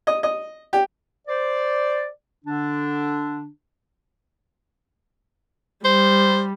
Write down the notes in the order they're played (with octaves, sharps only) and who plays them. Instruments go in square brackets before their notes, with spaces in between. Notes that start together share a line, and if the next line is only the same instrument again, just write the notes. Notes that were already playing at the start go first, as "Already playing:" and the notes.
[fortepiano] D#5
D#5
G4
[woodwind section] C5 D5
D3 D4
[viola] G3 [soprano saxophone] C5